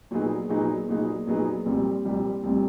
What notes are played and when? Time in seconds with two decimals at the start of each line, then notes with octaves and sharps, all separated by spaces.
0.11 A#2 F#3 B3 D#4 G#4
0.49 A#2 F#3 B3 D#4 G#4
0.89 A#2 F#3 B3 D#4 G#4
1.27 A#2 F#3 B3 D#4 G#4
1.66 C2 A#2 G3 C4
2.05 C2 A#2 G3 C4
2.44 C2 A#2 G3 C4